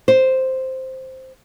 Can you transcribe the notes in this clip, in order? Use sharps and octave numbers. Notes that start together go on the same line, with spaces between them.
C5